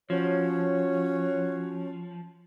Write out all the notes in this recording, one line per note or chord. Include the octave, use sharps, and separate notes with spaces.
F3 C#4 F#4 C#5